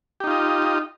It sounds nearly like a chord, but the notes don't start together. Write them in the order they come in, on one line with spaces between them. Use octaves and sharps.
G4 D#4 F4 D#5